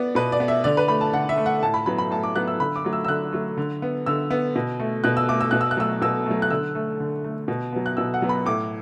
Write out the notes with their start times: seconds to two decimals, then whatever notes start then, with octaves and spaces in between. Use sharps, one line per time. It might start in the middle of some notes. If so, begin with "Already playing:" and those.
Already playing: B3 D5
0.15 B2 B4
0.32 D5
0.40 B3
0.48 E5
0.64 D3 D5
0.77 B4
0.88 A3 B5
1.01 A5
1.13 D3 F#5
1.29 E5
1.37 A3
1.46 F#5
1.63 A2 A5
1.74 B5
1.86 F#3 B3 B5
1.98 B5
2.11 A2 A5
2.23 D6
2.36 F#3 B3 F#6
2.48 E6
2.60 D3 B5
2.76 D6
2.85 F#3 A3
2.93 E6
3.05 E6
3.08 D3 F#6
3.33 F#3 A3
3.57 D3
3.82 B3
4.06 D3 E6
4.31 B3
4.56 B2
4.80 A3
5.04 B2 F#6
5.17 E6
5.29 A3 D6
5.41 E6
5.51 B2 F#6
5.61 E6
5.71 F#6
5.77 F#3 A3 E6
6.02 B2 E6
6.26 F#3 A3
6.42 F#6
6.50 D3 E6
6.75 A3
7.00 D3
7.24 A3
7.48 B2
7.73 F#3 B3
7.86 F#6
7.97 B2 E6
8.14 F#5
8.22 F#3 B3
8.29 B5
8.46 A2 D6